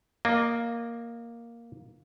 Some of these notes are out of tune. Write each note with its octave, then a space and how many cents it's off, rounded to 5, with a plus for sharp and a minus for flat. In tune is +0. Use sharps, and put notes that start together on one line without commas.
A#3 +0 D#5 -25